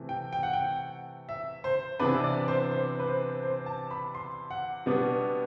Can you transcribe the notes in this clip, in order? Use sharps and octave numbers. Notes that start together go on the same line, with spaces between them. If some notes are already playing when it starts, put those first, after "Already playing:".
Already playing: C3 E3 A3
G5
G5
F#5
G5
E5
C5
C3 E3 B3 D4 B4
E5
D5
C5
C5
B4
C5
C5
A5
B5
C6
F#5
B2 G3 B3 D4